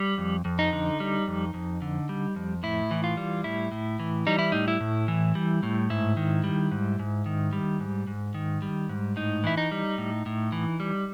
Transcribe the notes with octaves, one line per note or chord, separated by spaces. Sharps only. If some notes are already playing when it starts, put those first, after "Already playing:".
Already playing: G3
F2
F2
D#4
D3
G3
F2
F2
D3
G3
F2
A2 E4
E3
F4
G3
A2 E4
A2
E3
G3 D#4
E4
A2 D#4
E4
A2
E3
G3
A2
G#2 E4
D#3
G3
G#2
G#2
D#3
G3
G#2
G#2
D#3
G3
G#2
A2 D#4
E3 E4
D#4
G3
A2
A2
E3
G3